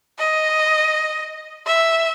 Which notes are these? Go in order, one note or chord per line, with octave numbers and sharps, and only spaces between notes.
D#5
E5